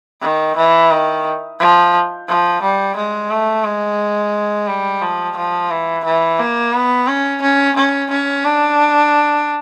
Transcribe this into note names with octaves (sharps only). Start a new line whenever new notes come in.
D#3
E3
D#3
F3
F3
G3
G#3
A3
G#3
G3
F3
F3
E3
E3
A#3
B3
C#4
C#4
C#4
C#4
D4